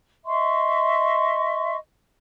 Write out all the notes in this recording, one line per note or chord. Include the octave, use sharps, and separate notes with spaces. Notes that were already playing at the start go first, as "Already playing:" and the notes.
D#5 E5 C6 C#6